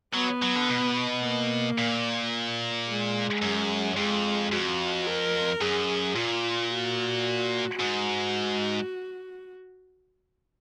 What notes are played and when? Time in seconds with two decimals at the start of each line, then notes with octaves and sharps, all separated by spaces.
0.14 F#3 B3
0.42 F#3
0.56 D3
0.70 B2
1.24 A#3
1.78 A#2
2.88 G#3
3.42 F#2
3.97 F2 G#3
4.52 F2 F#4
5.07 A#4
5.61 F#2 G#4
6.15 A#2 F4
6.70 F#4
7.79 G#2 F#4